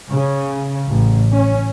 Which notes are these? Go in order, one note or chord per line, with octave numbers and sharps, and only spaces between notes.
C#3
A1
C#4